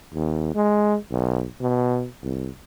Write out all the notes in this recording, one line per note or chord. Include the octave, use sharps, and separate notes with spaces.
D#2
G#3
B1
B2
C2